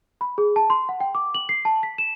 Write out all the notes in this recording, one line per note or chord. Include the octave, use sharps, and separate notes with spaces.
B5
G#4
A5
C6
F#5
G5
D6
F#7
C7
A5
B6
E7